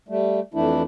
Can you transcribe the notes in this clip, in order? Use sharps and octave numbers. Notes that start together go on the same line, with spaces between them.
G3 A3
F2 E3 A3 D4 E4